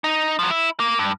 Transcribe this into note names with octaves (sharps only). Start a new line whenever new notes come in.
D#4
F3 F#3
E4
A#3
G2